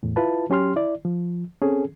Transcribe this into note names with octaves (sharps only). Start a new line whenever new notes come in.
E2 A2
E4 F4 B4 A5
F#3 C#4 G4 C6 F6
E4 D5
F3
C4 C#4 G#4 A4